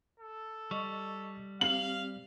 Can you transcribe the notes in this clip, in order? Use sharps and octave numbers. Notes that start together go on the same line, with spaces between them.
A4
G3 D#5 C#6
C4 G4 F5 F#7